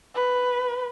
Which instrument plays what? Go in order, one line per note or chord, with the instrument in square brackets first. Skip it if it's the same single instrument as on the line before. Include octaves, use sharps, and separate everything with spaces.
[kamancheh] B4